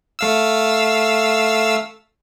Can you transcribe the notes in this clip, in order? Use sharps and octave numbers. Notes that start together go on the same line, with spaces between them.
A3 F5 E6